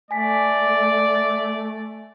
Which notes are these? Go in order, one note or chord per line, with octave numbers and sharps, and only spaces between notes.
A3 D5 G#5 B6